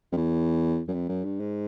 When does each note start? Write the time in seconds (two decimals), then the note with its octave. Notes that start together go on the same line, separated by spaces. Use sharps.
0.12 F2
0.17 E2
0.88 F#2
0.94 F2
1.09 F#2
1.25 G2
1.40 G#2